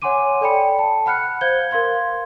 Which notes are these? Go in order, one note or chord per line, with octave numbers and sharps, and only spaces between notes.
C#5 F#5 G#5 C6 D6 D#7
A4 D5 G5 B5 C#7
A5
F#5 B5 F6 F#6 C#7
C5 F5 G6 G#6 G7
A#4 F5 C6 G#6